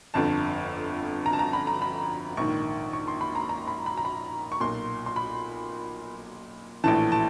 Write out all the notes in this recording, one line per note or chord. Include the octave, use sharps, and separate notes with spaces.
G1 F2 D3 A5
A#5
A5
A#5
B5
A#5
B5
A#1 G#2 D#3 C#6
C#6
C6
B5
A#5
A#5
B5
B5
A#5
B5
C#6
B1 A#2 C6
C6
B5
A#1 A2 E3 A5
A5